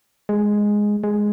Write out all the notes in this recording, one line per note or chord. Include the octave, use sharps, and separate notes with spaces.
G#3
G#3